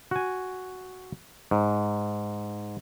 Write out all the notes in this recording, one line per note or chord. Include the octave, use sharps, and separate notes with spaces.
F#4 G#5
G#2